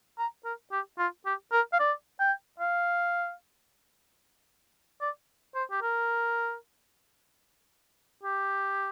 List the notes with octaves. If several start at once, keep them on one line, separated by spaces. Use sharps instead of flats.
A#5
A#4
G4
F4
G4
A#4
F5
D5
G5
F5
D5
C5
G4
A#4
G4